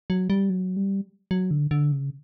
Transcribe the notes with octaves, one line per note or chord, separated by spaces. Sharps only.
F#3
G3
F#3
G3
F#3
D3
D3
C#3